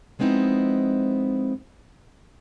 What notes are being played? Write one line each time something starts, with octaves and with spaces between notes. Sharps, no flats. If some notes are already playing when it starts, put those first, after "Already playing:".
F3 G#3 B3 C4 D#4 E4